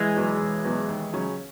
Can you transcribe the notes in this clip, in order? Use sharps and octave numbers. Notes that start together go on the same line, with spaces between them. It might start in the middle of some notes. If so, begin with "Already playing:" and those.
Already playing: E3 G#3
E2 B2 F#3 B3
E1
E2 B2 F#3 B3
D#2
C#3 F#3 C#4